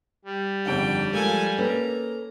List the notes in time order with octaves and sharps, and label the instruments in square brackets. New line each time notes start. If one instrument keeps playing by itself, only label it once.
[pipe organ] G3
[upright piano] G1 F2 F#5 [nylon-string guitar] D#3 [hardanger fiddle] G5
[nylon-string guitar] F3 G#3 A3 [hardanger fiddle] A4 G#5 [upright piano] A#4 F5
[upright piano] A#3 C#4 [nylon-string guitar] A4 B4 [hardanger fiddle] A#5